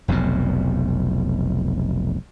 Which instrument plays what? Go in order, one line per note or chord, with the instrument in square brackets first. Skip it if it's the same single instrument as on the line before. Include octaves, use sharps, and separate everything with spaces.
[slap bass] F1 B1 F2 B2